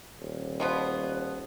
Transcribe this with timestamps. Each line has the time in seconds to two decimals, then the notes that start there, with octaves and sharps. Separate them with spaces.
0.19 D#1
0.60 B2 F3 B3